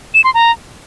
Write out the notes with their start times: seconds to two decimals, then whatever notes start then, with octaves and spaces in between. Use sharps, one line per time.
0.14 E7
0.24 C6
0.34 A#5